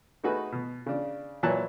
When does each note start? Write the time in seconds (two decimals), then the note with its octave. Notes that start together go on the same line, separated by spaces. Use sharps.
0.24 A3 D#4 F#4 G#4 B4
0.52 B2
0.86 C#3 D4
1.43 A#2 E3 F#3 C#5 A5 F#6